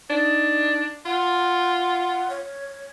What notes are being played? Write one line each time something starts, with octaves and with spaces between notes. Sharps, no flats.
D4 D#4
F4 F#5
C#5